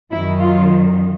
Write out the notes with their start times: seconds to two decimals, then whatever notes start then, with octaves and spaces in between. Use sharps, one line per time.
0.12 F#2 D#3 F#3 E4
0.41 F4